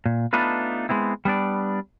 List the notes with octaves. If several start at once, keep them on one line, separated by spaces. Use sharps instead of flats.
A#2
A3 B3 D4 D#4 F4 B4
G#3 B3 C4 E4
G3 B3 D4 D5